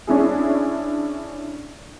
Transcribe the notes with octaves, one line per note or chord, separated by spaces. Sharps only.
C#4 D4 E4 G#4